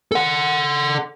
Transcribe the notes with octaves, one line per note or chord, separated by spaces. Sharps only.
A4 F#5